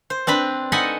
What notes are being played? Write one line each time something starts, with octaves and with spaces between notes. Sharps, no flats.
C5
C4 D4 B4 B5
D#4 A4 D#5 F#5 G#5 B5